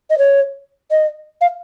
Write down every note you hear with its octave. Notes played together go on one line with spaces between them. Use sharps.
D#5
C#5
D#5
F5